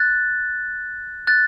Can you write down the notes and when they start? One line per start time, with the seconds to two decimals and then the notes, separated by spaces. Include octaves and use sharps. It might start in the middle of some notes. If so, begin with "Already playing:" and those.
Already playing: F#6 A6
1.27 F#6 A6